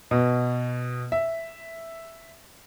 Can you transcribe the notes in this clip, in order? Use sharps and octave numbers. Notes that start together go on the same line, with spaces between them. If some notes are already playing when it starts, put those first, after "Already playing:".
B2
E5